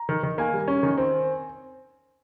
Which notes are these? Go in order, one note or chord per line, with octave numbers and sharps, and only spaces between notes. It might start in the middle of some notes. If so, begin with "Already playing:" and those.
Already playing: A#5
D#3
D#3
A#3 G#5
G3
C#4
D#3
C4